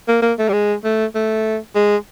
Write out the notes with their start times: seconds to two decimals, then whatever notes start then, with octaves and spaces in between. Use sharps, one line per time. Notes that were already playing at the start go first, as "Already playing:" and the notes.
0.08 A#3
0.22 A#3
0.39 A3
0.49 G3
0.53 G#3
0.84 A3
1.15 A3
1.75 G#3